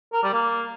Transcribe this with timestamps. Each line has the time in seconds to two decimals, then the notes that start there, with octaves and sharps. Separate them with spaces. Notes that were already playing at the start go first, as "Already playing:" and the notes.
0.13 A#4
0.23 G3
0.33 A#3